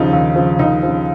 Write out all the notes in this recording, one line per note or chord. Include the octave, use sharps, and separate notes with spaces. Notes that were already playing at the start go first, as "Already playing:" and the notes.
Already playing: D#2 C#3 F3 D#4
D#2
C#3 F3
D#2 D#4
C#3 F3